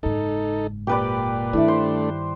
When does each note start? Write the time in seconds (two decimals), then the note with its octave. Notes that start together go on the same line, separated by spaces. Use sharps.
0.03 F#1 G#2 D#4 A4
0.87 A#2 G4 B4 D5
1.53 G2 D#3 A3 D4 E4 E5
1.68 C5